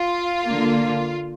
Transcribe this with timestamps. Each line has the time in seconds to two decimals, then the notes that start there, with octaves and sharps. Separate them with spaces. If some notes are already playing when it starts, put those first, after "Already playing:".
Already playing: F4
0.45 D3 A#3